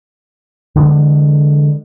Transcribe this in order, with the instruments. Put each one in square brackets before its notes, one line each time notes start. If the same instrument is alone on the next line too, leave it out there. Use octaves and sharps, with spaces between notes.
[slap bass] D3 E3 G#3